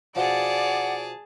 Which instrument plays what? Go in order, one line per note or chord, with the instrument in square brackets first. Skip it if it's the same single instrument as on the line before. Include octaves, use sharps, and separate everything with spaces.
[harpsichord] B2 F3 [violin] G#4 A5 [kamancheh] D5 [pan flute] F#5